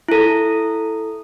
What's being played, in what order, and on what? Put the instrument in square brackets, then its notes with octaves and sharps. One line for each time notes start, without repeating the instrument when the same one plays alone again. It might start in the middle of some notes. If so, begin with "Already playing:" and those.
[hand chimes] E4 A4